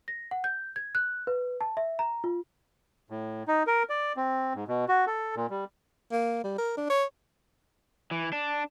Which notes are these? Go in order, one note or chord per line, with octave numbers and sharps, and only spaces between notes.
A#6
F#5
G6
G#6
F#6
B4
A5
E5
A#5
F4
A2
D#4
A#4
D5
C4
G#2
B2
F#4
A4
A#2
G3
A#3
G3
A#4
D4
C#5
E3
D4